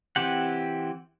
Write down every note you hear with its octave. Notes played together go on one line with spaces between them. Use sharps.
E3 C4 G4 F#5